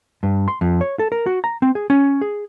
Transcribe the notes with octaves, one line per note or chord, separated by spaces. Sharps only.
G2
C6
F2
C#5
A4
A#4
F#4
A#5
C4
G#4
C#4
G#4